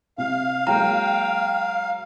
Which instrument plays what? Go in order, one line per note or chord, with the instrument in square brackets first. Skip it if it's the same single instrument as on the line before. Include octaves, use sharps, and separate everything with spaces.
[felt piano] C3 [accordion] F5
[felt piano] F#3 G#3 A#3 [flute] G5 [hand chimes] A#5